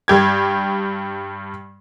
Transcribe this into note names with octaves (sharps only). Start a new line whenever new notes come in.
G2 G4 G#6